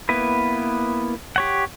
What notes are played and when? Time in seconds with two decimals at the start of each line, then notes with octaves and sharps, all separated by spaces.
0.09 A#3 B3 E4 B4
1.36 G4 C#5 F#5